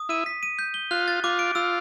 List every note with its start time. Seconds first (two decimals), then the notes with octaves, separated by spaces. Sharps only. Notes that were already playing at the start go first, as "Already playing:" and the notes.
Already playing: D#6
0.09 E4 D#7
0.26 B6
0.43 D#7
0.59 G6
0.74 G7
0.91 F4 F#6
1.08 A6
1.24 F4 D6
1.39 D7
1.55 F4 E6